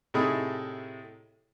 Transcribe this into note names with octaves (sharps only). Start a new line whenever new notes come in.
A2 C3 A3 D#4 E4 G#4